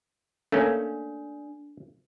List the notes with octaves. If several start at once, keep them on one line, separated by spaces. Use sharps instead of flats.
A3 A#3 C#4 D4